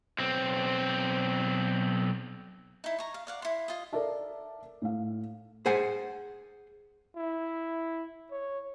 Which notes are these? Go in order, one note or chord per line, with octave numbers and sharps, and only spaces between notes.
B1 C4
D#4 E4
A#5 C#6
F5
D5 F5 F#5
E4 C6
F4 D#5
A4 A#4 D5 E5 A5
A2 F5
G#4 C5 F#5 G#5
E4
C#5